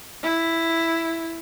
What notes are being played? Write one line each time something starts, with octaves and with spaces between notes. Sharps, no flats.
E4